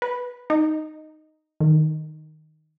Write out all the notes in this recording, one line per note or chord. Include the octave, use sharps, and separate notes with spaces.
B4
D#4
D#3